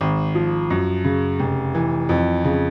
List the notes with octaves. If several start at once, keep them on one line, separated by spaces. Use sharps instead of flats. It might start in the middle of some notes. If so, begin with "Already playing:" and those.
G#1
F3
F#2
C#3
F1
E3
F2
C#3